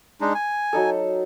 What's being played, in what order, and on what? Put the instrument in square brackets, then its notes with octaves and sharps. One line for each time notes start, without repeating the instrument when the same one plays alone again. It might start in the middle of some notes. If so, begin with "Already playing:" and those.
[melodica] G#3 D4 D#4
G#5
[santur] F#3 D#4 A4